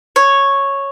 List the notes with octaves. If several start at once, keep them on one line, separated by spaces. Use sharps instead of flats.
C#5